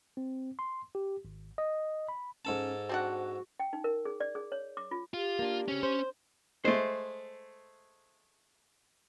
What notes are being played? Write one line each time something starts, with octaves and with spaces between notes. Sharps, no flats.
C4
C6
G4
G#1
D#5
B5
G#2 C#4 A4 A5
C4 D4 F#4 F#5
G5
D#4
A#4
G#4
D5
G#4
C#5
D6
F4
F4 G4
A#3 D4
C#3 C4 C#4
C5
G#3 A3 C5